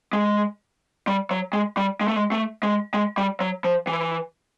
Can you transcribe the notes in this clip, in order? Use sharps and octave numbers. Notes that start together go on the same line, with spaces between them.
G#3
G3
F#3
G#3
G3
G#3
A3
G#3
A3
G#3
G#3
G3
F#3
F3
E3